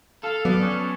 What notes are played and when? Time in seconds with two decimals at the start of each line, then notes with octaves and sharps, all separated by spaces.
0.24 A4 F5
0.45 F#3 B3 D5
0.62 C#4